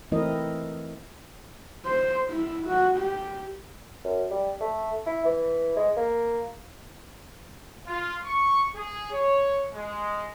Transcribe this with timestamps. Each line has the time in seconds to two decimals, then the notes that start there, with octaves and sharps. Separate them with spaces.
0.12 E3 A3 C4 E4 A#4 D#5
1.86 C5
2.30 E4
2.67 F#4
2.97 G4
4.05 F#2
4.31 G3
4.61 A3
5.06 E4
5.25 E3
5.77 G#3
5.97 A#3
7.87 F4
8.25 C#6
8.74 G#4
9.12 C#5
9.73 G#3